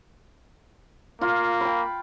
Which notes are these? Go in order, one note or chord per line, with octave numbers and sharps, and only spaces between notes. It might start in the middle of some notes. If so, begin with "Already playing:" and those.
A#3 F4
G5 B5